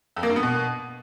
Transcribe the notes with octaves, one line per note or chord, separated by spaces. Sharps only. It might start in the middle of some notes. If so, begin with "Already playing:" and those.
F2
A#3
G2
B3
B2